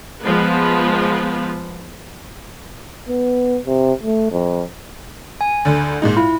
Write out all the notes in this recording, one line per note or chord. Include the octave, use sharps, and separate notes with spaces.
F3 G#3 B3 B4
B3
C3
A3
F2
G#5
D2 D3
A#2 G#3 D#4
E4 F4